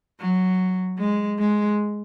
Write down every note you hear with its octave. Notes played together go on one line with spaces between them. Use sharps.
F#3
G#3
G#3